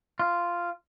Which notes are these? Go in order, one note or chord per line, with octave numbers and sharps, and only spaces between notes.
F4